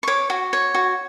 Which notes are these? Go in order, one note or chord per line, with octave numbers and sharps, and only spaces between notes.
C#6
C#5 D6
F#4
C#5
F#4